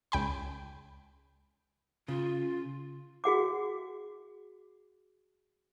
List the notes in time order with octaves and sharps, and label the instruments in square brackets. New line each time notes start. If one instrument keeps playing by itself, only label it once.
[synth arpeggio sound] C#2 G5 B5
[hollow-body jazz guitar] C#3 [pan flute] F4
[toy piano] F#4 G#4 F#5 D6